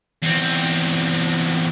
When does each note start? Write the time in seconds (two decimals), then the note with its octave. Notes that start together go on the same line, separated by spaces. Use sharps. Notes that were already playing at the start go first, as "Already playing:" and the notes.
0.22 E2 C4